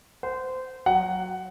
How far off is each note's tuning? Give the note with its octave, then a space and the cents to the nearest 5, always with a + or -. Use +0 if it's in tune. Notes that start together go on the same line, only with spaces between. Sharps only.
C5 -20 F#5 -10
F#3 +0 F#5 +10